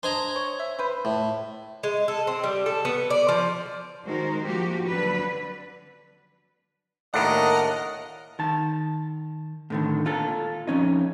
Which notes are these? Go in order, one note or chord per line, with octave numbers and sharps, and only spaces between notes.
D4 C5 D#5 G#5 A#5
C#5
E5
B4 C5
A2
G#3
A4
C4
G3
A4
B3
D5
F3
D#3 G#3 D#4 F#4 A#4 C5
F3 A#3 F#4 G4
D3 F#3 B4
D#2 A2 D4 A#4 D#5 F#5
D#3 A5
A2 D3 D#3
A#2 F4 A4
F2 C#4 D#4